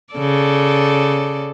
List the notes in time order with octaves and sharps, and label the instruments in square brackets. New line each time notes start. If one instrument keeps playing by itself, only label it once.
[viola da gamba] C#3 A4 D5